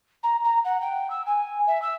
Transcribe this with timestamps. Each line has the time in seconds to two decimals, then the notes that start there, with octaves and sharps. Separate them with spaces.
0.23 A#5
0.44 A#5
0.64 F#5
0.81 G5
1.10 E6
1.26 G#5
1.67 E5
1.82 E6